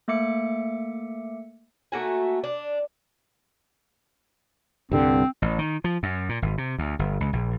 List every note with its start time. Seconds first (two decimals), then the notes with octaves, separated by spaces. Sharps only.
0.08 A3 A#3 E5 D6 C#7
1.92 A3 A#3 F#4 G#5
2.44 D4
4.92 C2 G2 D3 C4
5.42 A1
5.59 D#3
5.84 F3
6.03 F#2
6.29 A#2
6.42 G#1
6.58 C3
6.78 D2
6.99 G1
7.20 C#2
7.33 A#1